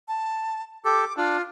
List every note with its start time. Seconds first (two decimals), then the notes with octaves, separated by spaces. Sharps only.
0.08 A5
0.85 G4 A4 D6
1.17 D4 F4